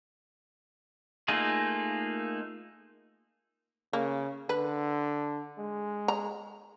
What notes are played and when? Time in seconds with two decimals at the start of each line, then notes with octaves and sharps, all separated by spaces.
1.28 A3 A#3 D#4 F4 G#4
3.93 C#3 A#3
4.49 D3 B4
5.58 G#3
6.08 A#5